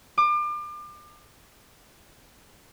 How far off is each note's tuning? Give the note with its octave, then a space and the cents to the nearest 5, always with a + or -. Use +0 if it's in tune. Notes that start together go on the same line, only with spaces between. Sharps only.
D6 +35